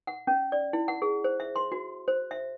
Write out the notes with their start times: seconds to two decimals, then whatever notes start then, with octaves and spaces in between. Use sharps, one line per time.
0.07 F#5
0.27 C#4
0.52 D5
0.73 E4
0.88 F#5
1.02 G#4
1.24 C5
1.40 E5
1.56 C6
1.72 F#4
2.08 C5
2.31 E5